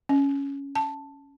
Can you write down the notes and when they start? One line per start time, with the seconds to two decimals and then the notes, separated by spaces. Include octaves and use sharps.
0.09 C#4
0.75 A5